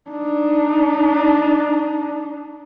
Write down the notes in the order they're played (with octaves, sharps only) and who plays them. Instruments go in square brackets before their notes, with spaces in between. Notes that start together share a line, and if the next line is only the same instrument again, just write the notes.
[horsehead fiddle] D4 D#4